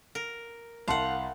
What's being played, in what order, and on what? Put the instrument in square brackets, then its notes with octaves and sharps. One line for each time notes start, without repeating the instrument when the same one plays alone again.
[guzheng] A#4
[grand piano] C2 A5 C6 [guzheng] F5 F#5